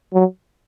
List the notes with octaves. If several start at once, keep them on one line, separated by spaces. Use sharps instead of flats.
F#3